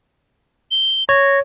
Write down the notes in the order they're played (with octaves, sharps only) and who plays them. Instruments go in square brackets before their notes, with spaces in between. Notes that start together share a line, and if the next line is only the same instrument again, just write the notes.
[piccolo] G7
[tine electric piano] C#5 [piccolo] A#6